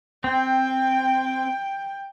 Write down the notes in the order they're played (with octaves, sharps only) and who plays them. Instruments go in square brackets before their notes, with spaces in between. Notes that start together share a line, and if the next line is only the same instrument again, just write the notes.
[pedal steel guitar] C4 [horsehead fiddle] G5